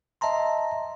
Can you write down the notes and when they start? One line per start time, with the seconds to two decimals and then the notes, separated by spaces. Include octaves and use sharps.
0.21 D#5 E5 A5 A#5 C6